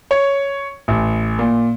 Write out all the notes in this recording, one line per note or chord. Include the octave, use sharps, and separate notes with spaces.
C#5
A1
A#2